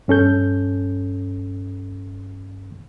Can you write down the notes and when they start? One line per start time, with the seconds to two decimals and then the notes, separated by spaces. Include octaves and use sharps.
0.08 G2 C#4 A4 G6